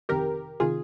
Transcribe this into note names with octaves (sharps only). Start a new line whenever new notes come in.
G1 F2 C3 D#3 G4 A#4
C3 D#3 F4 G#4